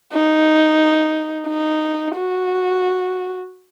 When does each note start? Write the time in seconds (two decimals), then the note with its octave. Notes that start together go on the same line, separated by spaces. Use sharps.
0.13 D#4
1.47 D#4
2.15 F#4